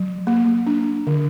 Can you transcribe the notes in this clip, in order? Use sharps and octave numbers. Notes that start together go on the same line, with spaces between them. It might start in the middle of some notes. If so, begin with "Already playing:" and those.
Already playing: F#3
A#3
D4
D3